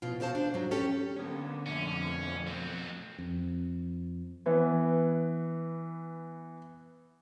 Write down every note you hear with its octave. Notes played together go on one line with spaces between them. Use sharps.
B2 F3 F4
B2 G#3 F#4 C5 F5 A5
D4 C5
G#2 F#3
C#4 G4 A4
D3 A#3 B3 C#4
F2 B2 A3 C#4 E5
F#3 C4
F2
E3 B3